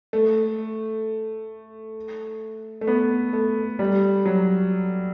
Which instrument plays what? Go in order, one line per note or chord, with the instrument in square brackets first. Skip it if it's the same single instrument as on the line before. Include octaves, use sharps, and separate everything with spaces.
[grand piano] A3
A3
B3
A3
G3
F#3